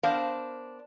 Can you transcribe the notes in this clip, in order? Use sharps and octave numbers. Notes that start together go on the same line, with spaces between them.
B3 D4 A#4 C5 F5